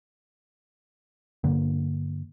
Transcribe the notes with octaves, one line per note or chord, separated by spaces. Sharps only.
G2 D3 A#3